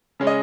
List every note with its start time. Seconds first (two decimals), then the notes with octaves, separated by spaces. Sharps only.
0.20 C#3 G#3 C#4
0.27 D#5